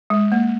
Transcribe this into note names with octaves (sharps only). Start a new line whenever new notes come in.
G#3
A#3